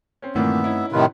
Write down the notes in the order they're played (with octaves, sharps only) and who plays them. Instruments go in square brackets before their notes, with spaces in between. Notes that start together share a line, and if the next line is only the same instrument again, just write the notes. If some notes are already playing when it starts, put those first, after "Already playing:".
[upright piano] C4 C#4
[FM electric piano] G2 A3 C4 [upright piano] A#2 D#3 E3 [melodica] B3 E5
[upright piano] C#4 D#4 E4
[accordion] A2 C3 D#3 [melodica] F4 B4